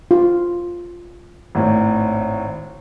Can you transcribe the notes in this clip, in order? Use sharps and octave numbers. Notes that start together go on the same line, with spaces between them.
F4
G#1 A2